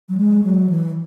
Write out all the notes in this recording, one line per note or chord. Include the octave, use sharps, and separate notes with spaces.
F#3
G#3
F#3
E3